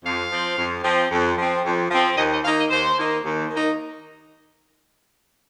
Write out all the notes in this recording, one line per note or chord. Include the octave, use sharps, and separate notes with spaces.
F2 F5
F3 C4
F2
F3 C4
F2
F3 C4
F2
F3 C4
D#2 D#5
D#5
D#3 A#3 D#4 F5
D#5
D#2 C5
D#3 A#3 D#4
D#2
D#3 A#3 D#4